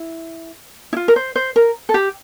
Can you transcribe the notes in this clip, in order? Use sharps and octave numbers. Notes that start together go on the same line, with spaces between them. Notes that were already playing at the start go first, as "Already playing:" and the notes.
Already playing: E4
E4
F4
A#4
C5
C5
A#4
A4
G4